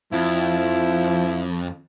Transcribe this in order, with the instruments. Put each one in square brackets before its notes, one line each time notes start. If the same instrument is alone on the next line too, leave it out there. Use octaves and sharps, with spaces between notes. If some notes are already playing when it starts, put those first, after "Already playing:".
[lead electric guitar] F2 [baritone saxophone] F3 [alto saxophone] E4